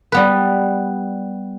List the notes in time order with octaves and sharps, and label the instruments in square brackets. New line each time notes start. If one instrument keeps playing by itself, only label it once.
[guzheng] G3 B3 B4